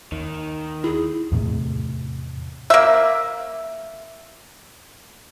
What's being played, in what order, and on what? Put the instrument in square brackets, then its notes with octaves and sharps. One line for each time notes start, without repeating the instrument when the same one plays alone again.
[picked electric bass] D#2 [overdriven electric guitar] D#3
[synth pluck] E4 [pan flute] G#4
[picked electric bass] E2 A2 C3
[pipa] A#3 E5